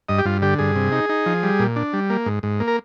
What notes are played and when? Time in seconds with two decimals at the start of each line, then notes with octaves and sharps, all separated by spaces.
0.09 G2 D#5
0.19 G4
0.25 G2 F4
0.42 D3 G4
0.59 G2 G#4
0.76 C3
0.92 D#4
1.10 D#4
1.26 F3
1.43 G3
1.59 A#2
1.76 D4
1.93 G3
2.10 A#3
2.26 G#2
2.43 G#2
2.60 A#3
2.68 A#4